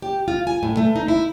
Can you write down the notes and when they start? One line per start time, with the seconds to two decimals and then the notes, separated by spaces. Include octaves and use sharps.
0.02 G4
0.28 F4
0.47 G#5
0.63 A2
0.77 A3
0.96 D#4
1.08 E4